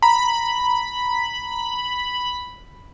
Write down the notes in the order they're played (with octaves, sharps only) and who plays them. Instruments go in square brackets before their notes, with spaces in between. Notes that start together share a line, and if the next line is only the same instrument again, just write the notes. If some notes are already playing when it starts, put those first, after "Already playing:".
[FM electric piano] A#5 [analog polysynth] B5